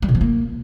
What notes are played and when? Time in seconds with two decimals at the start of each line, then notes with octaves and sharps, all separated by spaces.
0.02 G3
0.09 B2
0.15 F3
0.21 A#3